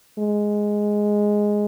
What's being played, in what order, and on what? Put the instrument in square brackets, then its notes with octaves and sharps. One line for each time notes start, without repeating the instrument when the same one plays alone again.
[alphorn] G#3